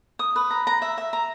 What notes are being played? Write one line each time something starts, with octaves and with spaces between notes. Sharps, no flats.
D#6
B4
A#5
A#5
E5
E5
A#5